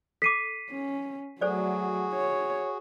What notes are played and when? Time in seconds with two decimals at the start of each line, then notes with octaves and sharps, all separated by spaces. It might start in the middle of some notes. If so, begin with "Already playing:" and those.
0.22 A4 D6 B6 C7 D#7
0.71 C#4
1.41 F#3 A3 F#4 G#4 A4 C5 D5
2.14 C#5